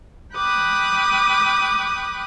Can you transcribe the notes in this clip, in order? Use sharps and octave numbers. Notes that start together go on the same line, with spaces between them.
G5 B5 D6 D#6 F#6